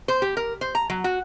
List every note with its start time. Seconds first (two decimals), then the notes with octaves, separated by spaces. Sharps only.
0.08 C5
0.22 G4
0.37 A#4
0.61 C5
0.75 A#5
0.90 F#3
1.04 F#4